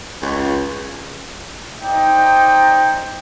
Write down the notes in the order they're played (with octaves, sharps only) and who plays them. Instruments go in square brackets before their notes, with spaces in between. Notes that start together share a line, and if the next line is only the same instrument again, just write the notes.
[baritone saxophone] C#2
[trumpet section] D#4 C5 D5 G5